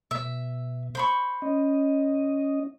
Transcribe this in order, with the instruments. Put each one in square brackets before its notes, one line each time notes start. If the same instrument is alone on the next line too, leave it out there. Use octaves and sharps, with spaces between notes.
[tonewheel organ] B2 [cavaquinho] E5
[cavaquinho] C5 B5 C#6
[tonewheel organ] C#4 D#5